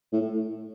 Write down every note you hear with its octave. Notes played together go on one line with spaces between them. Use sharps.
A2